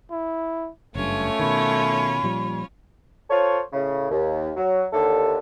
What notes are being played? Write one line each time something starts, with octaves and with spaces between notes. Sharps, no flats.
E4
F#1 G2 A3 C#4 F4 C#5
B2 D#3 B5
A#2 F3 G3
F4 A4 C5 C#5
A2 C#3
D#2
F#3
D#2 D3 A4